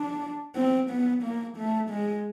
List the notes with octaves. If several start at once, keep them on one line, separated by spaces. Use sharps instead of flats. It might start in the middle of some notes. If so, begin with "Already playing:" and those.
Already playing: D4
C4
B3
A#3
A3
G#3